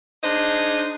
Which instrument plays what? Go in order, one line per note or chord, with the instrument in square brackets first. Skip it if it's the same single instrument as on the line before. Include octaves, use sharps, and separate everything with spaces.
[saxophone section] D4 D#4 G#4 C5